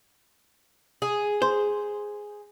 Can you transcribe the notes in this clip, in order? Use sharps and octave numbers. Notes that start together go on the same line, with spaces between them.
G#4
C5